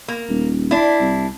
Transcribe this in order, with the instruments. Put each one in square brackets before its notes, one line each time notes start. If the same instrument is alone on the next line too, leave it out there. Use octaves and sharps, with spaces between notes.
[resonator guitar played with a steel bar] A#3
[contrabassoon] D#1
[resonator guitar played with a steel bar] D4 E4
[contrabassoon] C2